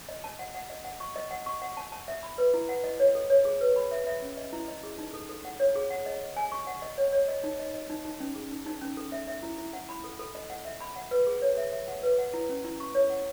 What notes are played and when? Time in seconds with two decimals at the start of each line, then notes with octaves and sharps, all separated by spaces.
0.09 D#5
0.24 A5
0.39 F#5
0.55 F#5
0.70 D#5
0.85 F#5
1.00 C#6
1.16 D#5
1.31 F#5
1.46 C#6
1.62 F#5
1.77 A5
1.92 A5
2.08 E5
2.23 B5
2.38 B4
2.54 E4
2.69 F#5
2.84 D#5
3.00 C#5
3.15 A4
3.30 C#5
3.45 G#4
3.61 B4
3.76 B5
3.91 E5
4.07 E5
4.22 C#4
4.37 D#5
4.53 E4
4.68 D#5
4.83 G#4
4.98 D#4
5.14 A4
5.29 A4
5.45 F#5
5.60 C#5
5.76 G#4
5.90 F#5
6.06 D#5
6.21 D#5
6.36 G#5
6.52 C#6
6.67 F#5
6.82 D#5
6.98 C#5
7.13 C#5
7.28 D#5
7.44 D#4
7.59 D#5
7.74 D#5
7.89 D#4
8.05 D#4
8.20 C#4
8.36 G#4
8.51 D#4
8.66 D#4
8.81 C#4
8.97 A4
9.12 E5
9.27 E5
9.43 E4
9.58 E4
9.73 F#5
9.89 B5
10.04 A4
10.19 A4
10.35 D#5
10.50 F#5
10.65 E5
10.81 B5
10.96 F#5
11.11 B4
11.27 G#4
11.42 C#5
11.57 E5
11.72 E5
11.88 F#5
12.03 B4
12.19 F#5
12.34 E4
12.49 C#4
12.64 E4
12.80 C#6
12.95 C#5
13.10 F#5